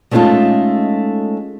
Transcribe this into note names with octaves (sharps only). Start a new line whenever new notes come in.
G#3 A3 C#4 D#4 F4 A4